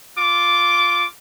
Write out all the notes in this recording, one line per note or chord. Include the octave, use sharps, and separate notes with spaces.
F4 D6